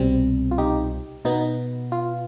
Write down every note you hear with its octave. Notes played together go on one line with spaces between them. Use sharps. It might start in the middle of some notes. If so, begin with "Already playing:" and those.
Already playing: C2 B2 G3 C4
F4
D#4 G4
B2 B3 D#4
F4